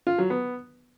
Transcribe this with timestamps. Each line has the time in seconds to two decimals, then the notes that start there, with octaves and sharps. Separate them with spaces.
0.07 F4
0.18 F#3
0.30 B3